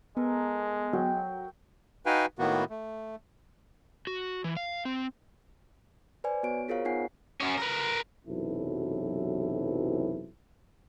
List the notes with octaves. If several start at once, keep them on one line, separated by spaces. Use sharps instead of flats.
G#3 B3 A4 A#4
F#3 G5
D#4 F#4 B4 F5 G5 G#5
A2 D#3 A#3 B3 F#4
A3
F#4
E3
F5
C4
B4 C5 D5 G#5
B3 F#4 C#5 D7
F4 G#4 A#4 C5 C#5 F5
B3 D#4 F4 F#5 G#5 C7
F#2 C#4
A#4 B4
B1 F#2 C3 E3 E4 A4